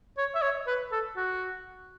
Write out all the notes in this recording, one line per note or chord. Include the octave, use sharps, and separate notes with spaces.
C#5
E5
C#5
B4
A4
F#4